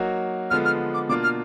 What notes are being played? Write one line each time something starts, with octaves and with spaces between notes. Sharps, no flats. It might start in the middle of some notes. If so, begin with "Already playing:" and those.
Already playing: F#3 A#3 D#4 F#4
D3 F3 G#3 B3 F4 F6
F6
D6
B2 A#3 D4 F4 D6
F6